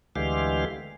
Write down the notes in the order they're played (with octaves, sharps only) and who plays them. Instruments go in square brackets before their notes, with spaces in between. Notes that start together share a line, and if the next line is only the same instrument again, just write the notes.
[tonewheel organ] D2 D3 E3 G#3 G4 F5